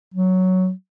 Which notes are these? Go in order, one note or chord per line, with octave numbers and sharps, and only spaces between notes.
F#3